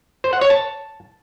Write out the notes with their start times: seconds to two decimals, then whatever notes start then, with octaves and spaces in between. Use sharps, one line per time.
0.24 C5
0.33 F#5
0.41 C#5
0.50 A5